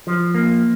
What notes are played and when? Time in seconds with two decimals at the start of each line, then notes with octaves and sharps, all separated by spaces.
0.07 F3
0.35 A#3